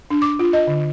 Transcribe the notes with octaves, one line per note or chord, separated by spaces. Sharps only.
D4
D6
F4
D#5
D3